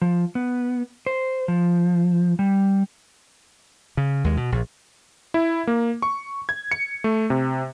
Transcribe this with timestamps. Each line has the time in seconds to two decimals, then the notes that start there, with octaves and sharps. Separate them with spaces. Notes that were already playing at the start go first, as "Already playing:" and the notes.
0.02 F3
0.35 B3
1.06 C5
1.48 F3
2.39 G3
3.97 C#3
4.24 D#2 G#3
4.37 B2
4.52 A#1
5.34 E4
5.67 A#3
6.02 C#6
6.49 G#6
6.72 C#7
7.04 A3
7.30 C3